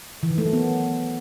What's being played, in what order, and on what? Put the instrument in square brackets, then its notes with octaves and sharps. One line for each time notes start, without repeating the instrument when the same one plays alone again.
[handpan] E3
D#3
A3
F#3
B3